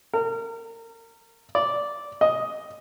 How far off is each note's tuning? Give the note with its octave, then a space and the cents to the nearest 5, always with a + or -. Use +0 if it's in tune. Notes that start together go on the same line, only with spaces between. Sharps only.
A#4 -30
D5 -10
D#5 +5